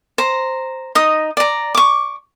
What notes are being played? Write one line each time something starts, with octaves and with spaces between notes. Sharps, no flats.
C5 A#5
D#4 D#5 D#6
D5 A#5
C#6 D6